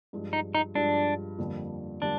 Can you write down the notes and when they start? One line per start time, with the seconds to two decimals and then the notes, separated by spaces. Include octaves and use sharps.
0.13 G2 F3 G#3
0.33 D#4
0.55 D#4
0.75 G2 F3 G#3 D4
1.39 F2 D3 G3 A#3
2.01 D3 G3 A#3 D4